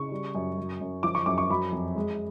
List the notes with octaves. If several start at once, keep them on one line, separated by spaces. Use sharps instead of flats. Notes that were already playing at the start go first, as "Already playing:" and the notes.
Already playing: C#3 C#6
G3
F#2
F#3
F#2
F3 D6
C#6
F#2 D6
C#6
F#3 B5
F2
G#3